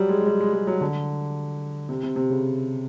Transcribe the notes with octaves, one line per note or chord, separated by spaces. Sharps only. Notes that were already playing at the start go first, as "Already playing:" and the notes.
Already playing: F#3 G3
G#3
G#3
G3
G#3
G#3
F#3
D3
C3
C3
C3
C#3